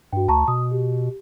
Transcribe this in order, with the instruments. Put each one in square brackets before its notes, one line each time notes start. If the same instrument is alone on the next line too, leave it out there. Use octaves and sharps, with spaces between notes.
[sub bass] G2 [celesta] F#4 G5
[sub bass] D2 [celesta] A5 A#5 C#6
[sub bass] B2 [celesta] D#6
[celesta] G4